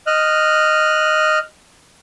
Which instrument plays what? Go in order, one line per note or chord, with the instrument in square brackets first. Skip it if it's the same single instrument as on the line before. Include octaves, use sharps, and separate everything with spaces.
[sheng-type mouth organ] D#5 F6 F#6